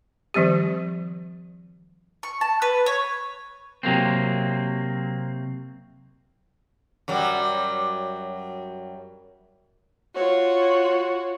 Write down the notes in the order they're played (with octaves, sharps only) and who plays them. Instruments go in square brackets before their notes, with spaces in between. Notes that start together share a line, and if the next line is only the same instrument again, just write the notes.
[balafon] D#3 F3 G3 C4 G4
[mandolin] C#6
A5
B4
C#5
[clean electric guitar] C3 F#3 A#3 C4
[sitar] F#2 F#3 G3
[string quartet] F4 F#4 C#5